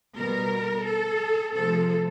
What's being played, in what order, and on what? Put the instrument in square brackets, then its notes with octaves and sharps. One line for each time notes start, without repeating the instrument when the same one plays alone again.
[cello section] B2 G3 B3 A#4
A4
C3 F3 A3 A4